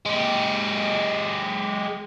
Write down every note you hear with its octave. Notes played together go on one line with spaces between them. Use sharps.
G#3 G4